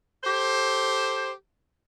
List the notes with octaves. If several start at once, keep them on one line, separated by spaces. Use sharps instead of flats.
G4 A4 C5